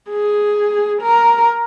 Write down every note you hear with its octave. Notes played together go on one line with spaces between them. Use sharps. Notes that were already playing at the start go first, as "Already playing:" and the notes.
G#4
A#4